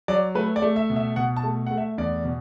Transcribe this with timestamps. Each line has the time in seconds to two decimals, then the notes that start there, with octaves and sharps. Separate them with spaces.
0.08 F#3 D5
0.35 A3 B4
0.56 D5
0.62 A3
0.76 E5
0.90 B2
0.96 E5
1.16 B2 F#5
1.36 A5
1.44 A3
1.66 A3 F#5
1.78 E5
1.98 E2 D5
2.25 B2